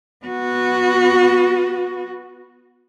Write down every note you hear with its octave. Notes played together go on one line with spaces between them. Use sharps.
B3 F#4